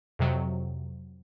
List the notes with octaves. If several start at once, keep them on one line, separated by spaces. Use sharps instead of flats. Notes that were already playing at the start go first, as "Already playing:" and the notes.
F2 C3 F#3